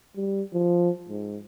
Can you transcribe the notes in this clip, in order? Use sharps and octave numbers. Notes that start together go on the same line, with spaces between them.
G3
F3
G#2